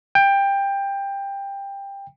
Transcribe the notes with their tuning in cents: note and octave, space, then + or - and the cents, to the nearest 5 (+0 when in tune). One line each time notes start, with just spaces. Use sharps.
G5 +20